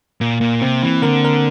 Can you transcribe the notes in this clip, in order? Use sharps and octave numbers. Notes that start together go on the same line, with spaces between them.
A#2 A#3
A#2
C3 C4
E3
D3 A#4
A#4